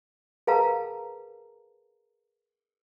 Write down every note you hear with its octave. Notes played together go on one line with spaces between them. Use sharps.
G#4 A#4 B4 F5 A5 A#5